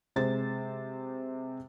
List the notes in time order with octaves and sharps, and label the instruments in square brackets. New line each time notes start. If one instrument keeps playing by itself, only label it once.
[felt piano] C3 G#3 C5 A6